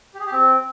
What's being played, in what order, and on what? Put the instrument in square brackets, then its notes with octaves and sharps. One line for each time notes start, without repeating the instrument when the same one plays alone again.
[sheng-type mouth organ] G4
G#4
G4
C4